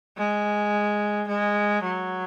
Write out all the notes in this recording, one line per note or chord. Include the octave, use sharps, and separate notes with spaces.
G#3
G#3
F#3